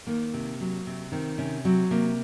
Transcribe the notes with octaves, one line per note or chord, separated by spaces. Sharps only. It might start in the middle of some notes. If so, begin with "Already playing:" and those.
D#3 A#3
C3
F#3
C3
D#3 C4
C3 C#4
F#3 C4
C3 A#3